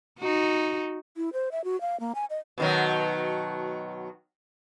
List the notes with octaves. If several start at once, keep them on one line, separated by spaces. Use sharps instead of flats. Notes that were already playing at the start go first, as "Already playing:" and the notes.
D#4 F#4
E4
C5
E5
F#4
F5
A#3
G#5
D#5
B2 D#3 F#3